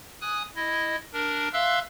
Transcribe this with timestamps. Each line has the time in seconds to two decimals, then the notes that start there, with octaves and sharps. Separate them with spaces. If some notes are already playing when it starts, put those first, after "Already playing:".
0.21 G#5 D#6 F#6
0.56 E4 D#5
1.13 D4 A#4
1.53 E5 F5 C6 E6 F#6